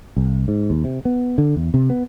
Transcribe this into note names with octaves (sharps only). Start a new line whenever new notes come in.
C2
G#2
D#2
C3
B3
D3
E2
C3
B3